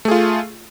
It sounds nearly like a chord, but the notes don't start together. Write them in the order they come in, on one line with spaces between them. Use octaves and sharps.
A3 G#4 F4